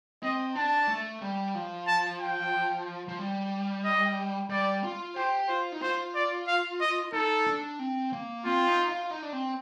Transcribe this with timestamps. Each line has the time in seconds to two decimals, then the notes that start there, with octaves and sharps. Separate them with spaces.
0.23 C4 D#5
0.55 D4 A5
0.88 A3
1.22 G3
1.55 F3
1.87 A5
2.20 G5
3.09 F3
3.19 G3
3.85 D#5
4.50 G3 D5
4.84 F4
5.16 G4 C5
5.49 F4 C5
5.72 D#4
5.82 F4 C5
6.15 D5
6.48 F5
6.81 D#5
7.13 D#4 A4
7.47 D4
7.79 C4
8.13 A#3
8.45 C4 F4
8.67 D#4
8.89 F4
9.11 D#4
9.23 D4
9.33 C4